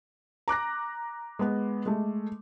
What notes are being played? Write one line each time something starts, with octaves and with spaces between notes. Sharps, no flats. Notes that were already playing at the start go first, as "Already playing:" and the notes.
A#5 D6 F#6 A#6
G#3 B3
G#3 A3